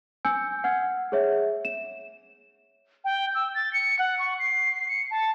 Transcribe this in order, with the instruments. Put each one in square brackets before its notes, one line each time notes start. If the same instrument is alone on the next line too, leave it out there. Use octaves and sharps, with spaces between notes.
[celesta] G#5 E6 G6 C#7
F#5 F6 G#6
G#4 C#5 E5
E7
[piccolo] G5
E6
A6
C#7
F#5
C#6
C7
C#7
A5